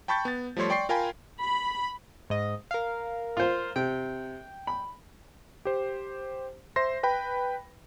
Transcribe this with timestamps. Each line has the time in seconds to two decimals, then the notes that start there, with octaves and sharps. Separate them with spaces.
0.08 G5 A5 B5 C#6 G6 A6
0.25 B3 A6
0.57 F3 G3 A3 C#5 C6
0.70 D5 G5 C6 C#6 C7
0.89 F4 A#4 F5 G5 G#5 B5
1.41 B5
2.30 G#2 D#5
2.71 A#4 F5
3.37 F4 C5
3.76 C3 G5
4.67 B5
5.65 G4 C5
6.76 C5 E5 C6 A#6
7.03 B4 G5 B5